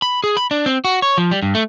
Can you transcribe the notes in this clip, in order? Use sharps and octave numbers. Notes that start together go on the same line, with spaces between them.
B5
G#4
B5
D4
C4
F#4
C#5
F3
G3
G2
A3